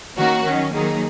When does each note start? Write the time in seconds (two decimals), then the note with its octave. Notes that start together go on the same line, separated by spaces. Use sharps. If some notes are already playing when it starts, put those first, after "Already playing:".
0.16 D#3 A#3 C#4 F#4 A#4
0.44 D#3 F#3 C#4
0.73 D#3 F#3 A#3 D#4 G#4